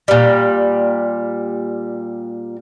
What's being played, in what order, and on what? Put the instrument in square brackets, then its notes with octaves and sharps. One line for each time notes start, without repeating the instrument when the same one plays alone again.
[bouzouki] A#2 G3